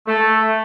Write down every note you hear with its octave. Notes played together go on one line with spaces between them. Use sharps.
A3